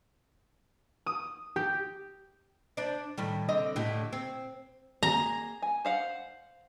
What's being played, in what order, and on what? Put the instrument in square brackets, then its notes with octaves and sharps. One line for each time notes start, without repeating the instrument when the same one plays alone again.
[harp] D#6
G4
[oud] D4 C5 D5
A2 D#3 G3
D3 C4 D#5
A2 D3 G4
C4
[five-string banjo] A#3 G#4 [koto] A#5
[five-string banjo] G#5
C5 F5 F#5